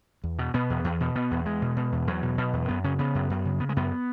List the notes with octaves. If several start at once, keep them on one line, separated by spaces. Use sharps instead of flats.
E2
B2
B2 B3
E2
E2
B2
B2 B3
E2
E2 G#3
B2
B2
E2
E2 F#3
B2
B2
E2
F#2 B3
C#3 C#4
C#3 B3
F#2
F#2
C#3
C#3 B3
G#3
F#2 B3